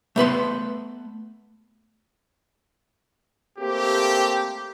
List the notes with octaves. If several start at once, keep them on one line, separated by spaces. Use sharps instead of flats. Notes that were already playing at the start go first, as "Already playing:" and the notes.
A3 B3 B4 C6
A3 A#3 C4 G4